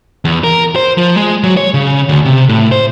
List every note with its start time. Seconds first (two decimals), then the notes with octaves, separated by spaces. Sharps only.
0.25 E2
0.44 A#4
0.76 C5
0.98 F3
1.17 G#3
1.44 F#3
1.57 C#5
1.74 C#3
2.09 D2
2.25 C3
2.49 A2
2.72 C5